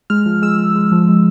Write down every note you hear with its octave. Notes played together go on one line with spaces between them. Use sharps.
G#3 F6
F3
G#3 E6
G#3
G#3
F3
G#3